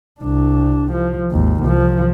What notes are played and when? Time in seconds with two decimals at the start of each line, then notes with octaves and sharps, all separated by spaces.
0.21 C2 D4
0.93 F3
1.31 G#1 D#2
1.64 C2 F3